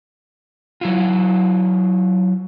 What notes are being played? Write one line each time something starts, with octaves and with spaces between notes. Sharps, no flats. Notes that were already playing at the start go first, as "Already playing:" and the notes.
F#3 E4 F4